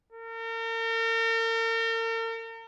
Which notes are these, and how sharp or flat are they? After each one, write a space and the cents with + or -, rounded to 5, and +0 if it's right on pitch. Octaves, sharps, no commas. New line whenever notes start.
A#4 -40